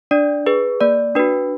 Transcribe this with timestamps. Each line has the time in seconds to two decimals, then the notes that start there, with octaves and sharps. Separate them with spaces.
0.11 D4 D5
0.46 G#4 B4
0.81 A#3 D5
1.15 D4 F#4 B4